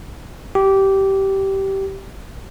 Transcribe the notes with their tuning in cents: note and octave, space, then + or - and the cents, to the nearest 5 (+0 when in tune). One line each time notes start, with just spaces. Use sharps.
G4 -15